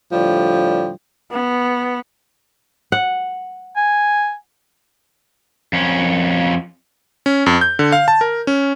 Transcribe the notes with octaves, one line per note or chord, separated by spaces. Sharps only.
A2 D3 F3 G3
B3
F#5
G#5
F2 C#4
C#4
F2
G6
D3
F5
A5
A#4
C#4